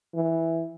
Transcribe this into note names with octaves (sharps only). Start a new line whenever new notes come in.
E3